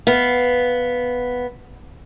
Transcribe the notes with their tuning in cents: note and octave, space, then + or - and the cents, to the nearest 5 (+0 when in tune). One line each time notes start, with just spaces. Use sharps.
B3 +0 F5 +0